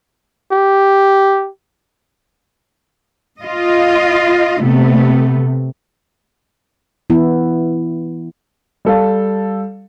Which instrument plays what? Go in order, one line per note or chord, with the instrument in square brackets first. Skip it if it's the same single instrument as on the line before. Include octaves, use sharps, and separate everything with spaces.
[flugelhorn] G4
[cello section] F4 D#5
[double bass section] C3 [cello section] A3 B3
[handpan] E3 B3 E4
[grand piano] G3 A4 F5